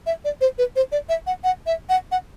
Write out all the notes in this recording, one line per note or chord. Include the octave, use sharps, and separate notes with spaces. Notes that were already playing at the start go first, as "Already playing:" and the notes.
E5
D5
C5
B4
C5
D5
E5
F#5
F#5
E5
F#5
F#5